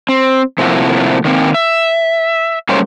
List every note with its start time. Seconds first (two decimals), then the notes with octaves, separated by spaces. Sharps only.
0.09 C4
0.58 C3 F3 A3 A#3 E4 F#4
1.25 D#3 A#3 C4
1.54 E5
2.69 F#3 G3 A3 A#3 C#4 C5